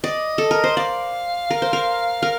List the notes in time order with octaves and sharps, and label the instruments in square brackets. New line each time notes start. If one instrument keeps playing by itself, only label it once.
[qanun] D5 [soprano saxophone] D#5
[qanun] A4
A#4
C5
[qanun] D5 [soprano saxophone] F5
[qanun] A#4
C5
A#4
A#4